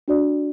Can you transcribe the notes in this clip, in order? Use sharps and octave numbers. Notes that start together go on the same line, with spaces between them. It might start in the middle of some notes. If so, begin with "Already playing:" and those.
D4 F#4 D5